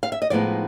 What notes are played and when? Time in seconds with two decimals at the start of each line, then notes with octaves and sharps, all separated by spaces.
0.03 F5
0.12 E5
0.22 D#5
0.30 A2 F3 G#3 B3 D#4 D5